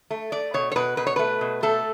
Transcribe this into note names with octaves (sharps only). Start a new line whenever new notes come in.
A3
A3 D5
B2 C#5
C#5
B2 B4
B2 B4
C#5
A3 B4
B2
A3 A4